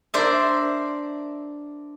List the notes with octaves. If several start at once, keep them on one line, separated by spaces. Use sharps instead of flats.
D4 A#4 C5 D5 E5